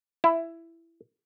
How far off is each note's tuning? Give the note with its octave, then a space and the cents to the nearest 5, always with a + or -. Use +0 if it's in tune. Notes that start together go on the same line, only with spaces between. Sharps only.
E4 +10